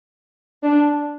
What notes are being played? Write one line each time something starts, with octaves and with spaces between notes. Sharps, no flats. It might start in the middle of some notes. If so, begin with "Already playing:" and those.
D4